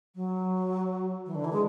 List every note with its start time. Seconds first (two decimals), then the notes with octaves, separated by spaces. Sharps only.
0.15 F#3
1.26 E3
1.35 D3
1.44 E3
1.52 G#3